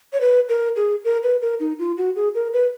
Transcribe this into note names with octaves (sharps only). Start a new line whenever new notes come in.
C#5
B4
A#4
G#4
A#4
B4
A#4
D#4
F4
F#4
G#4
A#4
B4